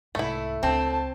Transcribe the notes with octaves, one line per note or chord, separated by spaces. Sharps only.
C2 G#2 A3 E4
C#2 C4 A5